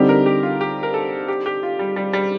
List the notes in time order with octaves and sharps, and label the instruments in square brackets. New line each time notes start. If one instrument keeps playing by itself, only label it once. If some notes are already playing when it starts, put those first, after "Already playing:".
Already playing: [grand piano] D3 G3 C4 D#4 [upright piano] G4
[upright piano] A#4
G4
F4
G4
A#4
A4
G4
G4
F4
G3
G3
G3